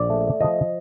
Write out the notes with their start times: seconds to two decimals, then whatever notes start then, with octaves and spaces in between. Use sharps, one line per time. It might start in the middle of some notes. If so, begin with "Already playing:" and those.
Already playing: A#1 D5
0.10 A3
0.41 F3 D#5